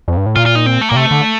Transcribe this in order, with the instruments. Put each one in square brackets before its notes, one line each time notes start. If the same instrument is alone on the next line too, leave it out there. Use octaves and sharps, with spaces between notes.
[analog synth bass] F2
G2
A2
[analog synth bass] A#2 [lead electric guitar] F4
[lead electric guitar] F4
D#4
C4
A3
[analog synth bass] A#2 [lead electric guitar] A#3
[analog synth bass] C3 [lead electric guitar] A3
[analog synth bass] D3